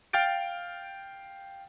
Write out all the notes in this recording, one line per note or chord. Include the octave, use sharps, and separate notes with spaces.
F5 G5 F6 G6 A6 D7